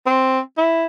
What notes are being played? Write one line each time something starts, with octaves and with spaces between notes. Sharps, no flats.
C4
E4